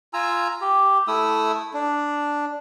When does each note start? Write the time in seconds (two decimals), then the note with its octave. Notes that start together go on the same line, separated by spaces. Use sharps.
0.13 F4 G#5 A#5 E6
0.61 G4
1.08 A3 E4 D#6 E6
1.74 D4